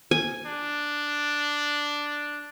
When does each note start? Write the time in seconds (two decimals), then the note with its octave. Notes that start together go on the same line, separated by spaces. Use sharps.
0.11 G#5
0.46 D4